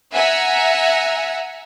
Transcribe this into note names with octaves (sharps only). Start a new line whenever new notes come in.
E5 F#5 G#5 A#5